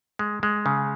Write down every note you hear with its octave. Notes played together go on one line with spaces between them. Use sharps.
G#3
G#3
C#3